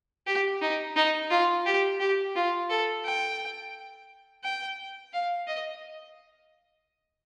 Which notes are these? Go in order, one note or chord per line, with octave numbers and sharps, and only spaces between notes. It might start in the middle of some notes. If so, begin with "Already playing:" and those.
G4
D#4
D#4
F4
G4
G4
F4
A4
G5
G5
F5
D#5